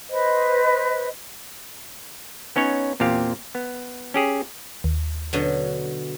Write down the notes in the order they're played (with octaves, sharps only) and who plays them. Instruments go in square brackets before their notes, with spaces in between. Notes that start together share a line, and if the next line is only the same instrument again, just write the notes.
[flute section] B4 C5 D#5
[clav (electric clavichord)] B3 C#4 D#4 C#5
E2 A#2 C4 G4 F5
B3
C#4 G4 G#4
[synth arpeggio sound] D#2
[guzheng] B2 D3 F#3